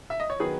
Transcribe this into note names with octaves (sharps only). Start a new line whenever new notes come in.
E5
D#5
C#5
D#3 F#3 B3 G#4 B4